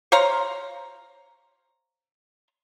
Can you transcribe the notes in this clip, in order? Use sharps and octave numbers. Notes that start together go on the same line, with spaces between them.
C5 C#5 F5 A#5